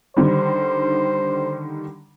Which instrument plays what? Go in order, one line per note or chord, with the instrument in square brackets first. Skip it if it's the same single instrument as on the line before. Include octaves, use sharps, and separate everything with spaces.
[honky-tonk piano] D3 D#3 G3 [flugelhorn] C5